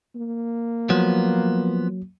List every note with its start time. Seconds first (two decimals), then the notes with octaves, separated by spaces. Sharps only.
0.15 A#3
0.90 F3 F#3 B3